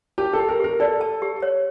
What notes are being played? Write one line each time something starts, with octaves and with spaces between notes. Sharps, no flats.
G4 A5
A4
G4
A#4
G4 A#4
A4 D5
A5
G4
C#5